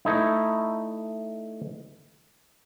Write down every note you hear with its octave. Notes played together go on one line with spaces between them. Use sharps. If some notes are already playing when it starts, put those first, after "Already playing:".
A3 D#4 E4